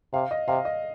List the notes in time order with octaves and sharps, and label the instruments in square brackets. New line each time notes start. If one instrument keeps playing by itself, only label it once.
[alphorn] C3 [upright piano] F5
[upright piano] D#5
[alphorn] C3 [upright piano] F5
[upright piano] D#5